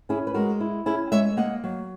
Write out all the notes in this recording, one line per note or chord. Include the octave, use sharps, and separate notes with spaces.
C#4 E4 G#4
B4
G#3 F#4 A#4
E4
C#4 E4 G#4
G#3 C#5 E5
A#3 D#5 F#5
F#3